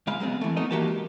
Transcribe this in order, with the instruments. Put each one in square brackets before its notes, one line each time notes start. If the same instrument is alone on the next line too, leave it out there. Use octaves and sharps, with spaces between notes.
[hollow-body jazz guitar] C#2 G#3 F5 B5
F#3 G#3 B3 C4
E3 A3
F3 A3 B3 D#4 D#5
E3 A#3 F#4 G4 A#4 A5
G#3